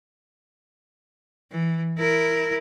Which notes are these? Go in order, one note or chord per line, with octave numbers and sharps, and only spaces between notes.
E3
E4 A#4